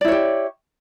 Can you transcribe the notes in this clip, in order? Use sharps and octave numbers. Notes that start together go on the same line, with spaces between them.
E4 G4 C#5 D5